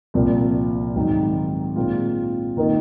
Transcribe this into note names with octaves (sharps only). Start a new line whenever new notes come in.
C2 A#2 F3 C4
G#2 D#3 F#3 C4 D#4
A#2 G#3 C4 F4
D#3 A#3 D#4 A#4 D#5